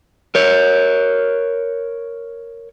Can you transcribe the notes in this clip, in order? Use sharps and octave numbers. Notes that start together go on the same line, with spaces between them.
A#4 C#5